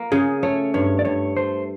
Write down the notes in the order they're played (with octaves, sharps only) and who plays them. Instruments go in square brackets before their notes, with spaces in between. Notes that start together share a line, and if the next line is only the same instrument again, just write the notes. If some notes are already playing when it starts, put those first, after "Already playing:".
Already playing: [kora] A#3
[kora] C#3 [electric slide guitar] G#4
[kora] A3 [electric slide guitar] C#5
[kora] G2 [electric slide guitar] C#5
[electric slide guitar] D5
[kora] G2 [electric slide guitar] C#5
[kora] A3 [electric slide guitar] C5